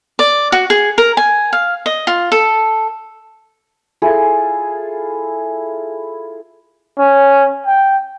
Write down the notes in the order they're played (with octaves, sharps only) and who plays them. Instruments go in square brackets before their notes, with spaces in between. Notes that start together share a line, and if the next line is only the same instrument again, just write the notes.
[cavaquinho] D5
F#4
G#4
A#4
G#5
F5
D#5
F4
A4
[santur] E4 F4 G#4 A4
[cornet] C#4
G5